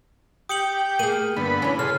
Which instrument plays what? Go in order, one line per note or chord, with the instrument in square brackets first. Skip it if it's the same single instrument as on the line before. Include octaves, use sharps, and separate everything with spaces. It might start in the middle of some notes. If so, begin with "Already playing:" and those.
[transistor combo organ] G4 G5 [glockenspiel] D#6 C#7 F#7
[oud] A#3 G#4 [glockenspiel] D#7 F#7
[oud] G2 [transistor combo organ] D3 B3 B5
[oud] E3 C#4
[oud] C#3 [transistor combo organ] G#4 A4 C6 [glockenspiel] F6